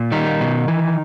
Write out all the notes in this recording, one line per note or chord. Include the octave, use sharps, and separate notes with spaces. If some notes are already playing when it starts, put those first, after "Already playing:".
Already playing: A#2
D#3 G3 D#4
B2
E3